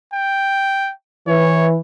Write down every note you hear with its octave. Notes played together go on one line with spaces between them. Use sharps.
G5
E3 C#5